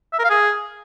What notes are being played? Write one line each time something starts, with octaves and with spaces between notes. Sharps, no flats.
E5
A#4
F5
G#4